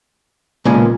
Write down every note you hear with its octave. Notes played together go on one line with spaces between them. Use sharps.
B1 A#2 C#3 G#3